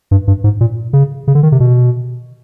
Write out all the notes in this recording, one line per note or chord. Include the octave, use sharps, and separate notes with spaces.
G2
G2
G#2
A#2
C#3
C#3
D3
D#3
C3
B2